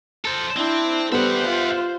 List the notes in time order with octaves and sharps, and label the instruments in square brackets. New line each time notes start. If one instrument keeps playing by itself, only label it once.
[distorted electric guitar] A4 C5
[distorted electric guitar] C4 [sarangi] D4 [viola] E4
[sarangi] G3 [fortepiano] B3 A4 [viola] C5 [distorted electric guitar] E5 F#5
[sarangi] F4